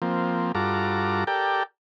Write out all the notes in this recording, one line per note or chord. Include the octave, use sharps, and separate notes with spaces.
F3 A#3 C4
G2 F4 F#4 A4 A#5 D6
G4 A4 A#4 D5 G5